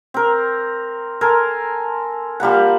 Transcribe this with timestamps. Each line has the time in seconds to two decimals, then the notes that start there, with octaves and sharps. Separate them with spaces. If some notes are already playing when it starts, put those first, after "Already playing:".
0.14 C4 A#4
1.21 A4 A#4 G#5 C6
2.40 F3 G3 A#3 F#5